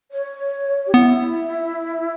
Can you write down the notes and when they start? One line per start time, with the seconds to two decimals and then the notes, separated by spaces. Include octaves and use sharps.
0.11 C#5
0.86 G4
0.94 B3 E4